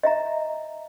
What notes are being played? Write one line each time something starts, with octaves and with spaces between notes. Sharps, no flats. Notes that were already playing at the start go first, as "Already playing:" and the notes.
D#5 E5 A#5